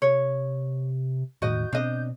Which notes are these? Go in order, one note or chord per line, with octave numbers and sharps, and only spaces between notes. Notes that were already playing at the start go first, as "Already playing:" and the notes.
C3 C#5
E1 A2 D#3 F#4 D#5 G6
B2 C4 D4 D#5